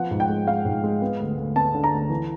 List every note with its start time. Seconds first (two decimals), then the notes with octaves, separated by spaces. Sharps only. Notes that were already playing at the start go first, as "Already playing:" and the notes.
Already playing: F3 B3 F#5
0.11 G#2
0.20 G5
0.29 G#3
0.47 G#3 F5
0.65 G#2
0.84 G#3
1.02 B3
1.19 D2
1.37 D2
1.56 B3 A5
1.75 D3
1.84 A#5
1.92 D2
2.10 E3